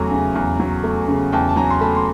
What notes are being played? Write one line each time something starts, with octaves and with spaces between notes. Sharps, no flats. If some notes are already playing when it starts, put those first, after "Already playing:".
Already playing: E2 C#3 F#3 A3 G#5 A#5
C#3
E2
F#3
A3
C#3
E2 G5 A5
A5
F#3 G#5 A#5
C6
A3 A5 B5
C6